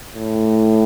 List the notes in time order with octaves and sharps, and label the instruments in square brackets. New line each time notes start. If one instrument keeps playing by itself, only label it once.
[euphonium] A2